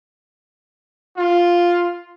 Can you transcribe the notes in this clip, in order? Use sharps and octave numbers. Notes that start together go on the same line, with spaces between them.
F4